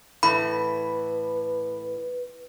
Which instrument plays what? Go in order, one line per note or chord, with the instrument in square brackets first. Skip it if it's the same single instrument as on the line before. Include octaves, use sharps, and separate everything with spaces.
[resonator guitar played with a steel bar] A2 E3 [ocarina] B4 [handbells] B5